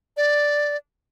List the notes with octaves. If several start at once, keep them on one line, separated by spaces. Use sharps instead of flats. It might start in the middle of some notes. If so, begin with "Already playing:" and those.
D5